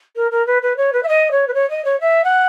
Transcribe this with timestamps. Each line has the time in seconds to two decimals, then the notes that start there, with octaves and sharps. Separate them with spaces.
0.15 A#4
0.30 A#4
0.46 B4
0.62 B4
0.76 C#5
0.92 B4
1.02 E5
1.07 D#5
1.31 C#5
1.47 B4
1.54 C#5
1.69 D#5
1.84 C#5
2.00 E5
2.23 F#5